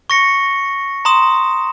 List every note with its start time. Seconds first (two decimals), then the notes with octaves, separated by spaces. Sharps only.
0.10 C#6 A#6 C#7
1.05 A#5 C6 D#6 E7